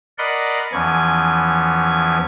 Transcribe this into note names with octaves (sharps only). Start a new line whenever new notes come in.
A#4 D5 D#5 F#5 B5 C6
E2 E3 F3 C#4 G#6